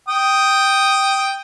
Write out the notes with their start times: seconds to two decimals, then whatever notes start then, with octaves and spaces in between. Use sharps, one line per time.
0.08 G5 D#6